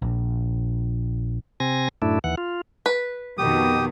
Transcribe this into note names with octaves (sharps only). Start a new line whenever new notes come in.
A#1
C3 C4 G#5 A#6
F#2 A2 A3 D4 E4
D#2 E3 F#5
F4
B4
F2 B2 D#3 G4 D#6